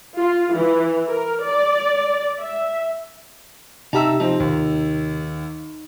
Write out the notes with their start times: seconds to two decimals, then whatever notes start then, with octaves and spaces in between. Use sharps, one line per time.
0.18 F4
0.54 E3
1.09 A#4
1.44 D5
2.41 E5
3.93 C3 D#4 G4 E5 A5 A#5 E6
4.20 F3 C4 D#4
4.40 D#2